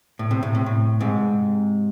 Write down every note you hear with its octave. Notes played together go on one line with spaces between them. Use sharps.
A2
C3
A2
C3
A2
G#2 C3